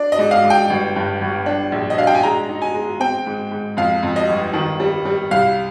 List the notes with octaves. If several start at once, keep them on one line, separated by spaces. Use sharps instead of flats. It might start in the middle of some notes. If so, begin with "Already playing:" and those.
Already playing: D4 D5
D#5
G#2
F5
G#2
G5
G1
G2
G1
D4
A#1
D#5
D4 F5
G5
G#5
G#3 A#5
D#4
G#5
G#3
C4 G5
G#2
G#2
F2 F5
F2
D#5
G1
D#3
G3
G3
C2 F5